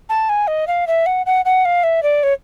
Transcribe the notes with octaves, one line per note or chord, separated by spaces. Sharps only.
A5
G#5
D#5
F5
E5
F#5
F#5
F#5
F5
E5
D5
C#5